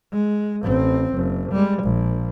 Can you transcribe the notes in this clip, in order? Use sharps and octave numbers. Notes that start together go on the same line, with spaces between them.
G#3
A1 C4
F#1
G3 G#3
A#1